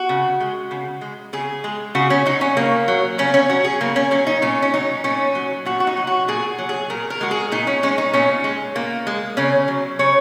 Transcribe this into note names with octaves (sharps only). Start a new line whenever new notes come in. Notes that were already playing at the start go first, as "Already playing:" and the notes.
Already playing: F#4
C#3
G#3
C#3
G#3
C#3 G#4
G#3
C#3 F#4
C#4
F#3 D#4
C#4
C#3 A#3
F#3
C#3 C#4
C#4
F#3 F#4
G#4
C#3 A#3
C#4
F#3 C#4
D#4
A#2 C#4
C#4
F#3 D#4
A#2 C#4
F#3
A#2 F#4
F#4
D#4
F#3
F#4
A#2 G#4
F#3
G#4
A#2 A#4
A#4
G#3 F#4
G#4
A#2 D#4
C#4
G#3 C#4
D#4
A#2 C#4
G#3
A#2 A#3
G#3
C#3 C#4
F#3
C#3 C#5